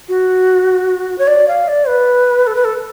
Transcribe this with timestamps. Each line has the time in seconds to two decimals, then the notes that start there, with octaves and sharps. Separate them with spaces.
0.09 F#4
1.18 C#5
1.28 D5
1.48 F5
1.68 D5
1.88 B4
2.47 A4
2.56 B4
2.65 A4